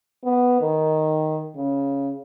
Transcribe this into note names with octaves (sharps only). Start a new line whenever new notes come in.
B3
D#3
C#3